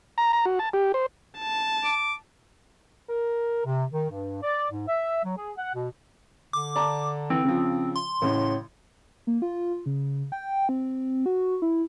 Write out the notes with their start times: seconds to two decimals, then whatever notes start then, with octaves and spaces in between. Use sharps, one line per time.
0.18 A#5
0.33 A#5
0.45 F#4
0.59 A5
0.73 G4
0.94 C5
1.39 A5
1.84 D6
3.09 A#4
3.65 C3
3.91 D#3
4.10 G2
4.42 D5
4.71 G#2
4.87 E5
5.24 F#3
5.37 G#4
5.57 F#5
5.73 B2
6.53 D3 D6
6.76 D5 A5 A#5
7.30 E3 C4
7.45 C#3 F3
7.96 C6
8.22 A1 A2 C#3
9.27 A#3
9.42 F4
9.86 C#3
10.32 G5
10.69 C4
11.26 F#4
11.62 E4